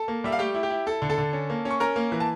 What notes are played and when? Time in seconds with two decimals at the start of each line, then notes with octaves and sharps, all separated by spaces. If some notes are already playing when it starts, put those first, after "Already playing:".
Already playing: A4 A5
0.08 A#3
0.24 G3 E5
0.32 F5
0.39 A3 G4 G5
0.55 E4
0.63 G4 G5
0.70 E4
0.87 E4 A4 A5
1.02 D3
1.10 A4 A5
1.18 D3
1.33 C#4
1.50 A#3
1.65 C#4
1.71 C#6
1.80 C#4 A#4 A#5
1.96 A#3
2.12 E3
2.20 A5